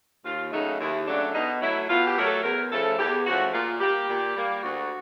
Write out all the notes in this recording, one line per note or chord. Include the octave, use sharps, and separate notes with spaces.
D#2 F4
C#3 F#3 A3 D#4
D#2 E4
C#3 F#3 A3 D4
B2 D#4
F#3 A3 E4
B2 F4
G4
F#3 A3 A#4
A4
E2 A#4
C#3 F3 A3 A4
E2 G4
C#3 F3 A3 F#4
A#2 F4
G3 A#3 G4
A#2
G3 A#3
D2 F#4